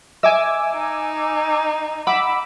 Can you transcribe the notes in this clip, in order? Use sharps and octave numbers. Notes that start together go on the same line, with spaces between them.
D#5 E5 G#5 D6 E6
D#4
F#5 B5 D6 E6